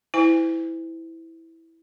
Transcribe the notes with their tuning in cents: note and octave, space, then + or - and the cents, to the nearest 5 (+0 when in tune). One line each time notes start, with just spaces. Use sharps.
E4 -10 C5 -45 G#5 -25